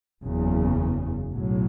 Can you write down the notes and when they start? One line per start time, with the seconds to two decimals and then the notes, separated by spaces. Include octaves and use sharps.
0.23 F#1 E2 C#3
1.30 B1 A2 F#3